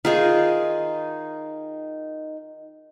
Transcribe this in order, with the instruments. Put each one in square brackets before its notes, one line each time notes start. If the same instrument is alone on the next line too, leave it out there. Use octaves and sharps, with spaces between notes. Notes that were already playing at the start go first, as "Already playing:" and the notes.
[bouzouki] D#3 D#4 [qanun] F4 G#4